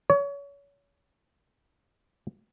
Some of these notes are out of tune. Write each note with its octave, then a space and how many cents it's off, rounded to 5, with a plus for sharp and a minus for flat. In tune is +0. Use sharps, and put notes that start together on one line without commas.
C#5 +30